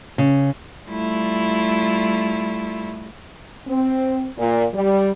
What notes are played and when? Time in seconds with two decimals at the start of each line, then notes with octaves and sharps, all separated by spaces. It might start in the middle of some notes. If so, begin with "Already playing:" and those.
0.18 C#3
0.88 G3 A3 E4 F4
3.67 C4
4.38 A#2
4.74 G3